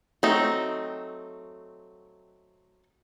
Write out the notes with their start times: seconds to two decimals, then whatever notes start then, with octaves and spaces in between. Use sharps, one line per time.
0.23 F#3 A3 C4 D#4